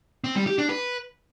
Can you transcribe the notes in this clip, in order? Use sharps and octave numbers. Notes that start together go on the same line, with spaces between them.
C4
G3
G4
D4
B4